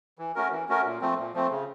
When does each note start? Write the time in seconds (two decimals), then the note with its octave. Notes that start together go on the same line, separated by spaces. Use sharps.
0.19 E3
0.35 A3 C#4 F#4 A#4
0.51 E3
0.69 A3 C#4 F#4 A#4
0.85 A#2
1.01 F3 A3 C4
1.18 A#2
1.34 F3 A3 C4
1.51 C#3